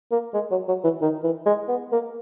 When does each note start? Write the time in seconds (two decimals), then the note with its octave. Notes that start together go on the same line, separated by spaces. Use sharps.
0.12 A#3
0.34 G#3
0.51 F#3
0.68 F#3
0.84 E3
1.01 D#3
1.23 E3
1.46 G#3
1.68 B3
1.92 A#3